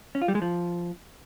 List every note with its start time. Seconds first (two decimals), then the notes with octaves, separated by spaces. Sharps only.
0.15 C#4
0.22 F4
0.28 G3
0.35 G#3
0.42 F3